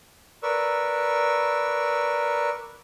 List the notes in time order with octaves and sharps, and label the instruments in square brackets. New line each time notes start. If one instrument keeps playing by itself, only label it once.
[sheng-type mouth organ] A#4 B4 D5 C#6 E6